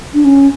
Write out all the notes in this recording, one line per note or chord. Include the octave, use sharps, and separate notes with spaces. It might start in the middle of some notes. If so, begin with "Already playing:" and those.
D4
C#4